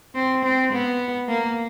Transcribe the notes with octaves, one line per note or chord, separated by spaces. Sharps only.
C4
C4
B3
A#3